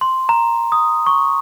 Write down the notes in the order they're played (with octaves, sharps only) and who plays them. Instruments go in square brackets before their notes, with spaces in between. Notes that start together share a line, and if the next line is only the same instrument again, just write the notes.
[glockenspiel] C6
A#5
D#6
C#6